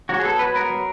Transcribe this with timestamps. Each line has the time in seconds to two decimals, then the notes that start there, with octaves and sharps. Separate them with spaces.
0.09 F#3 F#4
0.20 G#4
0.24 B3 A4
0.39 F#3 B4
0.55 B3 A#4
0.70 F#3